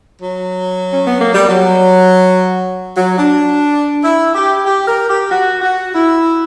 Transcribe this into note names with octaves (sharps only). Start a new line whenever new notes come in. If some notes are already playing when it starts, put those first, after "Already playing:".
F#3
C#4
B3
A#3
G3
F#3
F#3
D4
E4
G4
G4
A#4
G4
F#4
F#4
E4